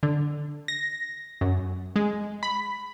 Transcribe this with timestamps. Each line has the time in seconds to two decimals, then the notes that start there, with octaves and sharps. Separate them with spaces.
0.03 D3
0.68 A#6
1.41 F#2
1.96 G#3
2.43 B5